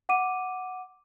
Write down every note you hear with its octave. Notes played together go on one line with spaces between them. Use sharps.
F#5 D6 D#7